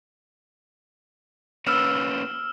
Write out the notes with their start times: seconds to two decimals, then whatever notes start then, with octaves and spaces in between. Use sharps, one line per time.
1.67 A#3 C#4 B4 E6 F6 E7